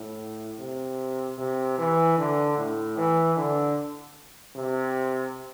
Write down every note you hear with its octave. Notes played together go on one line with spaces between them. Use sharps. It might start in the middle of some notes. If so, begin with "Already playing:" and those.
Already playing: A2
C3
C3
E3
D3
A2
E3
D3
C3